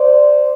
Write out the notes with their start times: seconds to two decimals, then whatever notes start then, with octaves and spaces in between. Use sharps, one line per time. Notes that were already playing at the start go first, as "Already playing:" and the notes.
Already playing: C5 D5